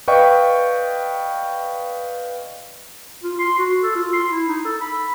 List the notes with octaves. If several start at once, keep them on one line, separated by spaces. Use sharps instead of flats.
B4 D5 D#5 F5 G5 C#6
F4
C6
F#4
A4
F4
C6
E4
D#4
A4
B5